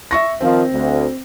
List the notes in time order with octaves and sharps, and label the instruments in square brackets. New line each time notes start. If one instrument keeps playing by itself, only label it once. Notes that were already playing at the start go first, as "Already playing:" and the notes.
[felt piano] E5 C#6 A#6
[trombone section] D#3 F3 [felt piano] C4
[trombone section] D2